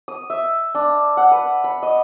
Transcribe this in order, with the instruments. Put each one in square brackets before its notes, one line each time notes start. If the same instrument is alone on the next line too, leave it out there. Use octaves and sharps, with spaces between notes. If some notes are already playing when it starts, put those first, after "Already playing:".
[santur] D#6
E5
D4
F#5
B4
B5
D#5